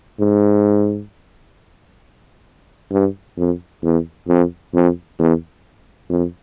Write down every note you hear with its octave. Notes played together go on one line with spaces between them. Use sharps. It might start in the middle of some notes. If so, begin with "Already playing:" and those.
G#2
G2
F2
E2
F2
F2
E2
F2